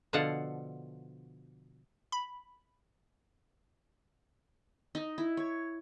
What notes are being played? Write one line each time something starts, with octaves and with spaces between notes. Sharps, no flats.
B2 D3 F3 A4 F5 F#5
B5
D#4
E4
C#5